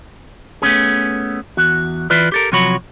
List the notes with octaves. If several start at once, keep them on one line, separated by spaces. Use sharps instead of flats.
A3 B3 C#4 G#4
E2 F#4
E3 E4 F4 B4 D5
G4 A4 A#4
C3 F3 F#3 F#4 C#5 B5